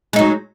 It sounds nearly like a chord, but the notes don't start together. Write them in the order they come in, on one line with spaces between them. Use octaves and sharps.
G#3 D#4 F#3